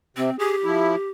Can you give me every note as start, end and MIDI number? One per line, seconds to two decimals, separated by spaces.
0.17 0.30 48
0.17 0.36 60
0.39 1.10 67
0.39 0.56 68
0.64 0.96 53
0.64 0.96 64